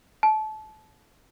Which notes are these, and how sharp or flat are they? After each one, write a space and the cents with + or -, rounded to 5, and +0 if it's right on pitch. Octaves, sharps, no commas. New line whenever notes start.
A5 -25